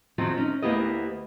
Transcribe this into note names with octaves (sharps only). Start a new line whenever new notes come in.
F2 D#3 F3 F#3 C4
C#4 D#4
D2 A#3 B3 E4 G4 D#5